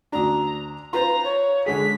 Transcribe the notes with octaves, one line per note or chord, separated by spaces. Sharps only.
D2 D4 A#5
F4 B4 C5 A#5
C#5
D3 G#3 G#4 B6